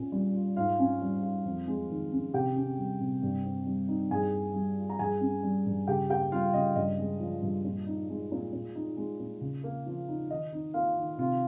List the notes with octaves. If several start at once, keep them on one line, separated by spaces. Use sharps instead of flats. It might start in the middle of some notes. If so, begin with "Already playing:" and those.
Already playing: A#2 C#4
G3
F4
G#2 F4 F5
C#4
G3
F4
F2
G#3
D#3
C#4
C3 G4 G5
C#4
G3
C3
G2
C4
G3
D#4
G2 G#4 G#5
A#3
G3
F4
A#5
G2 G#4 G#5
C#4
G3
G2
C#3 G4 G5
A#3 G4 G5
G3 F4 F5
C#3 D#5
G2 D#5
G#3
F3
G2
A#2
D#4
G#3
A#2
A#2
D#4
G#3
A#2
C#3
A#3
F3
D#4
D#3 D#5
D#4
A#3 F4 F5
D#3
C3 F4 F5